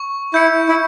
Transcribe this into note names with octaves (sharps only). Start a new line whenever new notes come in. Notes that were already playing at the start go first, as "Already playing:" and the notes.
Already playing: C#6
E4 G6 C#7
E4